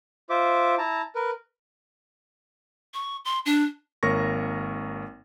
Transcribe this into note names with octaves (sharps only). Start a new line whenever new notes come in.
F4 C5 E5 D6
E4 A5 A#5
A#4 B4
C#6
C6
D4
G#1 A#3 A#4 C#5 C#6 A#6